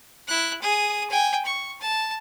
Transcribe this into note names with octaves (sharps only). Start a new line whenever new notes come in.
E4 F#6
G#4 D#6
G5 G#5
C#6
A5